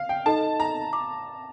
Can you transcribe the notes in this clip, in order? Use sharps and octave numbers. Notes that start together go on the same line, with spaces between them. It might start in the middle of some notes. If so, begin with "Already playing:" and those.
Already playing: F5
G5
D#4 A4 D#5 A5
A#5
D6